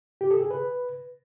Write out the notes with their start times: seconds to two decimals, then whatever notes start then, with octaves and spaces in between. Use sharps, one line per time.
0.21 G4
0.31 A4
0.41 G#4
0.51 B4